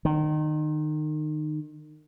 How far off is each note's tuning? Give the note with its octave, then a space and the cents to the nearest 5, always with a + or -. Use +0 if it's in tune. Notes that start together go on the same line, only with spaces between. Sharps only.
D#3 -30